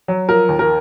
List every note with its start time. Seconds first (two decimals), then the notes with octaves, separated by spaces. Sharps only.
0.08 F#3
0.28 F3 A#4
0.49 D#2
0.59 A#4